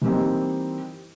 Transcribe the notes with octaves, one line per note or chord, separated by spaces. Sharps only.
E3 G3 A#3 C4 D#4 G4